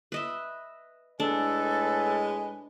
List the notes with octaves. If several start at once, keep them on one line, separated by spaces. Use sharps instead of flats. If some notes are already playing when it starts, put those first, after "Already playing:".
B4 D#5 E5
A2 G#3 D4 A4 B4 G#5